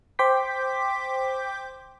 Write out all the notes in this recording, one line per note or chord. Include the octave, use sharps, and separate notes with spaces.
C5 G5 C6 D6 G6 B6